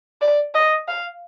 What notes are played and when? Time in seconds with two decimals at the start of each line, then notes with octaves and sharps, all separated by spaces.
0.21 D5
0.55 D#5
0.88 F5